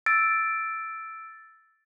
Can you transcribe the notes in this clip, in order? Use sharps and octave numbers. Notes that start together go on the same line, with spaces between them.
E6 A6 D7